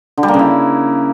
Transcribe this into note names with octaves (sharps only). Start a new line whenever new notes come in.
D3
G3
A#3
C#3
E4